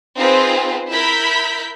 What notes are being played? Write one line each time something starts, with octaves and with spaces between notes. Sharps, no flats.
C4 D#4 F4 G#4 B4 C5
E4 A#4 E5 B5 G6